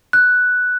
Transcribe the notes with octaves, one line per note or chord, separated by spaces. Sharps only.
F#6